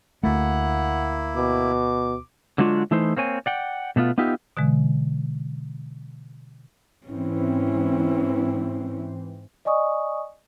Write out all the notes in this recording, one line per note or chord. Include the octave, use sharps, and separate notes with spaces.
D2 A3 A#3 E4 F#5
B2 D6
D3 F#3 G#3 D4 F4 C#5
E3 A3 D#4 E4 C5
A#3 C4 C#5 G#5
D5 F#5 G5
B2 A3 B3 F4
B3 D#4 F4 G4 E5
B2 D3 E3 G#3
G#2 E3 C4 C#4 E4
D5 D#5 G#5 C#6 D#6